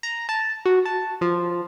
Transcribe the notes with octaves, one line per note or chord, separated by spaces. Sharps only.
A#5
A5
F#4
A5
F3